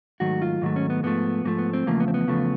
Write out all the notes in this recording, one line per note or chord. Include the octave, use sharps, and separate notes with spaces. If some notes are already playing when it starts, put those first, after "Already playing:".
G#2 D#3 F#3 A3 F#4
F4
G#2 D#3 F#3 A3
C#4
B3
G#2 F3 A3 B3
G#2 F3 A3 A#3
B3
C4
E2 C#3 F3 A3 A#3
B3
C4
B3
E2 C#3 F3 A3